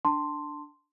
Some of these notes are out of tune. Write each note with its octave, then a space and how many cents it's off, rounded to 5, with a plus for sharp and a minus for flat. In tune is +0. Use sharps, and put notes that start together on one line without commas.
D4 +0 A5 +25 C6 +0